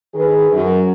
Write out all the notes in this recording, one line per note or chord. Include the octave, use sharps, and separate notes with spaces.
D#3 G#4 B4
F#2